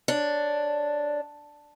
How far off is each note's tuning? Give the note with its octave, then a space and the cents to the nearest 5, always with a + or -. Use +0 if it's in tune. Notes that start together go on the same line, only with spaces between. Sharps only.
D4 +0 C#5 +10